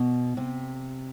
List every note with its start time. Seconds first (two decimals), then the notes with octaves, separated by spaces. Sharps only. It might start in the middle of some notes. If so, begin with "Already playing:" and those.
Already playing: B2
0.37 C3